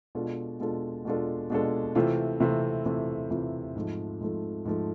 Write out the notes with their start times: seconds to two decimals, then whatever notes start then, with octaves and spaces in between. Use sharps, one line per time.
0.15 B2 G#3 D4 F4 A4
0.60 B2 G#3 D4 F4 A4
1.05 B2 G#3 D4 F4 A4
1.50 B2 G#3 D4 F4 A4
1.95 C3 E3 A3 C4 F4
2.40 C3 E3 A3 C4 F4
2.85 C3 E3 A3 C4 F4
3.30 C3 E3 A3 C4 F4
3.76 G#2 F3 A3
4.20 G#2 F3 A3
4.65 G#2 F3 A3